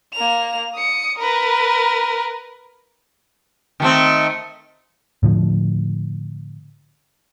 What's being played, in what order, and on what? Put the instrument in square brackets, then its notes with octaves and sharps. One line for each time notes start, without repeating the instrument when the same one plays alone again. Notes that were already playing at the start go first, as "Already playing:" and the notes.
[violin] A#3 F7
D#6 C#7
A#4 B4
[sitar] D#3 A3 C4
[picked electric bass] A2 D3 F3